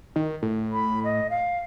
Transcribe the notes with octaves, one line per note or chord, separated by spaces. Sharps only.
D#3
A2
B5
D#5
F5